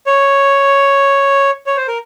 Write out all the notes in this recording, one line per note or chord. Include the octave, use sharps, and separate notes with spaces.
C#5
C#5
C5
A#4